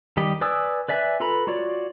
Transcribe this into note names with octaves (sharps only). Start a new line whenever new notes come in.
D#3 G3 G4 D#5
B4 D5 G#5 D#6 E6
B4 D5 E5 G#5 F#6
F4 A4 B4 A#5 B5
F4 F#4 C#5 D5